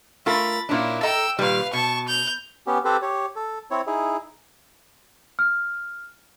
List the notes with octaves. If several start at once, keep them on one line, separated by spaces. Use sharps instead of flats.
A3 F4 A#4 B5 A6
A#2 A#3 C#4 D4 E4
A4 D#5 G5 A#5 E6
A#2 D#3 G3 B4 F5
B2 A5 C#6
G6 F7
B3 C#4 G4
C4 G4 A4 B4 C5
G4 C#5
A4
C4 E4 C#5
D#4 E4 G#4
F6